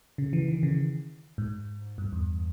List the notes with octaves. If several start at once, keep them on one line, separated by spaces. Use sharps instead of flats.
C#3
E3
D#3
C#3
G#2
G2
E2